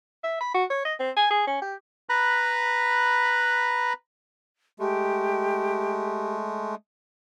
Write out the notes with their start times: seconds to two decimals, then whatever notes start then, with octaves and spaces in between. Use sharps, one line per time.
0.24 E5
0.41 B5
0.54 F#4
0.70 C#5
0.85 D#5
0.99 C4
1.16 G#5
1.30 G#4
1.47 C#4
1.62 G4
2.09 B4 A#5 B5 F#6
4.80 G#3 A3 G4